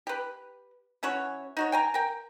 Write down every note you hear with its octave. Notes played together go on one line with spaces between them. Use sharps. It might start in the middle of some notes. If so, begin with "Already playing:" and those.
G4 B4
E3 C#4 F#4 C#5
D#4 F#4 C#5
G5 G#5 A#5
A#4 G5